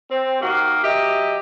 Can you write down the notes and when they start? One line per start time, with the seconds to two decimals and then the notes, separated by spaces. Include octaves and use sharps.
0.11 C4
0.40 D#3 A#3 F#4 G4
0.84 F#3 G4 D#5 E5